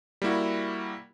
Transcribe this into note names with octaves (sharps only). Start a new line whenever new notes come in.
G3 A#3 E4 F#4